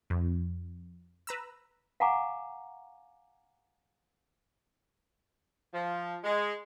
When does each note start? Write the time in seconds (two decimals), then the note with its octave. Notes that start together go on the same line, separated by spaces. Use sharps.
0.10 F2
1.27 B4 A#5 E6
2.00 F5 F#5 G#5 A#5 C#6 D6
5.73 F3
6.24 G#3